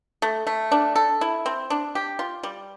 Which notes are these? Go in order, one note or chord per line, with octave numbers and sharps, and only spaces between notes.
A3
A3
D4
A4
E4
C4
D4
G4
F4
G3